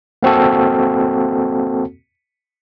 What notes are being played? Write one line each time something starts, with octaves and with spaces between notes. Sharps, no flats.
A#3 C4 F#4 A4